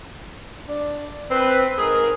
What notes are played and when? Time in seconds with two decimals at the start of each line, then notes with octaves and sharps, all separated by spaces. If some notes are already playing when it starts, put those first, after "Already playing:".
0.68 D4
1.30 C4 B4
1.78 G#2 G#4 A#4